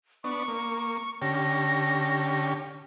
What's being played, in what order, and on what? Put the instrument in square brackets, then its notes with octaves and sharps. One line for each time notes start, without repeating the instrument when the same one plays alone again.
[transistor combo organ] B3 D4 [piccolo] C#6
[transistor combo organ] A#3
[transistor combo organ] D3 C#4 G4 [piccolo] A#6